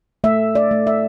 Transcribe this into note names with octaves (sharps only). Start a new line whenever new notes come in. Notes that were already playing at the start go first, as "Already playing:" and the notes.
A3 E5
D5
A3
E5